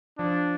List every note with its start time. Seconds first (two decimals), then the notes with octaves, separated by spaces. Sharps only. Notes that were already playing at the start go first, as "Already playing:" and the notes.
0.18 F3 D4